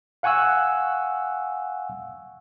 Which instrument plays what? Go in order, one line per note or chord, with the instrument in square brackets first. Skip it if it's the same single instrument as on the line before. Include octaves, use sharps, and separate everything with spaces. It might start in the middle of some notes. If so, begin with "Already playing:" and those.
[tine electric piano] F5 F#5 G#5 C#6 E6 F#6